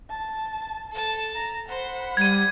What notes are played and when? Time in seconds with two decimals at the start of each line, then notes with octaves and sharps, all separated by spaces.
0.10 A5
0.91 A4 A5
1.35 A#5
1.68 C5 F#5 B5
2.17 G3 G#6 D#7